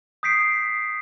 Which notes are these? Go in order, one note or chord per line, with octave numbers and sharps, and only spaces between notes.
D#6 G6 B6 C7 D7